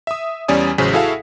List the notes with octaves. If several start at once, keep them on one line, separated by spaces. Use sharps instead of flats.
E5 D#6
E2 G3 C#4 D5 G#5 D#6
A1 C#3 F#3 G#4 C5 B6
E4 F#4 G#4 A4 E5 F5